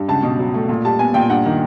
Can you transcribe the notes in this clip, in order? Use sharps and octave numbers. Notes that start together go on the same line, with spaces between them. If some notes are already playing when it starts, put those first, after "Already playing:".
Already playing: G2
C#2 A5
B2
F#3
A3
A#2
G3 A5
B3 G#5
A#2 G5
G2 F#5
D#3